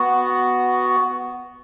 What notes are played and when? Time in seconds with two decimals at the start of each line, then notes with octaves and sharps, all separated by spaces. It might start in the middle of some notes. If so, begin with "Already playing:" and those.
Already playing: B3 F#4